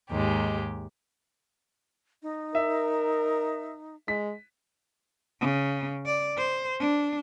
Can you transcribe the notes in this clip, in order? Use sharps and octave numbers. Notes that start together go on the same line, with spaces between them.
D#2 G#2 G#3 G4
D#4
A#4 E5
G#3 B6
C#3
D5
C5
D4